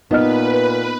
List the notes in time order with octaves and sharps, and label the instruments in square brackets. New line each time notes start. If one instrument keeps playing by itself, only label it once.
[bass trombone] A#2 [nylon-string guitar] B3 [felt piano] D#4 D#5 F6 [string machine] B4